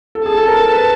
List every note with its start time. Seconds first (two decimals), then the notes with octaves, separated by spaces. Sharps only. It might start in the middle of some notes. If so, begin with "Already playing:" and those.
0.15 A4
0.25 G#4 A5
0.37 A4
0.48 A#4
0.60 A#4
0.71 B4